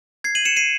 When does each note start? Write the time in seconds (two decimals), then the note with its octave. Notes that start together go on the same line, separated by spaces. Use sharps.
0.24 G#6 C7
0.35 D#7 F#7
0.45 C#7 E7
0.56 C7 D#7